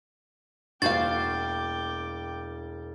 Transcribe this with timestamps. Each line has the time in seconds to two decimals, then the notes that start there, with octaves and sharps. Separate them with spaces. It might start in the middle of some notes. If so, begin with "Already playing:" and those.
0.82 E1 A#3 F#4 C5 F5 G5 D6 A6